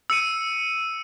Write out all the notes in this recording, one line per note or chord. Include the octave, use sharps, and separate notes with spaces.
E6 C#7 D#7